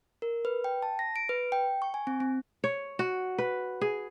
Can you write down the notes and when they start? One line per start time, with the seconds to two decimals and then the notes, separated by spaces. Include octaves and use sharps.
0.22 A#4
0.45 B4
0.64 G5
0.82 A5
0.99 A#6
1.16 D7
1.29 B4
1.52 G5
1.82 C#6
1.94 G#5
2.07 C4
2.20 C4
2.64 C#5
2.99 F#4
3.38 B4
3.81 G#4